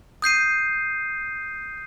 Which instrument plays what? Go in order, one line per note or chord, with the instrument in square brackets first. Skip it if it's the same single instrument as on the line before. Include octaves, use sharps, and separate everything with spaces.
[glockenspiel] D#6 G6 C7 D#7